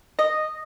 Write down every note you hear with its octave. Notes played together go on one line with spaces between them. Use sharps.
D#5